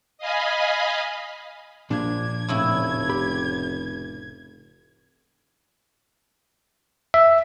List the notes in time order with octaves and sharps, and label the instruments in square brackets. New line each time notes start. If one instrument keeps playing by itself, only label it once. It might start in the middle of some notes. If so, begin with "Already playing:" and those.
[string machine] D#5 F5 G#5 B5
[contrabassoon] A#1 [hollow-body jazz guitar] A#2 F3 D4 [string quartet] G#6
[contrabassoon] F1 [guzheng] A2 C#3 E4
[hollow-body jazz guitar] G4 B5
[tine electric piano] E5